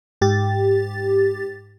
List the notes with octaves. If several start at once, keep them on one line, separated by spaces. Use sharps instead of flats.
G#2 G4 A6